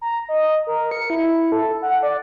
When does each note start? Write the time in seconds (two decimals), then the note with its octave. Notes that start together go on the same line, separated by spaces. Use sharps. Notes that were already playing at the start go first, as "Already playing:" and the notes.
0.01 A#5
0.29 D#5
0.67 A#4
0.91 C#7
1.10 E4
1.52 A4
1.82 F#5
2.03 D5